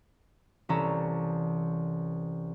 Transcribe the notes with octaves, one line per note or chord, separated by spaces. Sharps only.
C2 E3 C#4 A4 A5 A#5